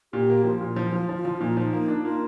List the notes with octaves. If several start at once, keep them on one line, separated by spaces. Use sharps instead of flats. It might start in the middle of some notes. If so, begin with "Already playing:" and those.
A#2 G4
A#3
F3 F4
A#2
F3
F3
F3
F3
A#2 D#4
F3
A#3
D4
A#3 F4